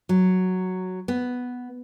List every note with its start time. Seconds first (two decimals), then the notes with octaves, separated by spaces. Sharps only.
0.09 F#3
1.08 B3